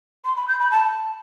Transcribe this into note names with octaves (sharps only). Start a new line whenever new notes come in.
C6
B5
G6
B5
A5